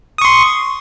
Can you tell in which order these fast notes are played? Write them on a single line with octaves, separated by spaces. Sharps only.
D#6 C#6 C6